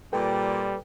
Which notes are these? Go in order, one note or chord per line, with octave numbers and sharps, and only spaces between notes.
A#2 G3 A4 B4 G5